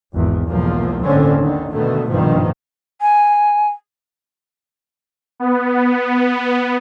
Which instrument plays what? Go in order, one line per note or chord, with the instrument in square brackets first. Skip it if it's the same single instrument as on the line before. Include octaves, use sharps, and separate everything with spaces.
[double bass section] G#1 E2
B1 E2 G#2 F3 A#3
G1 D#2 A2 D3 C4 C#4
D3 D#3
B2 D3 D#3 A3 B3
A#1 G2 B2 D#3 F3
[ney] G#5
[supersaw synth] B3